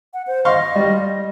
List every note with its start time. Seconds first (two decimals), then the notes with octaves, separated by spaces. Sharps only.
0.14 F#5
0.27 C5
0.45 D#5 F5 C6 C#6
0.76 G3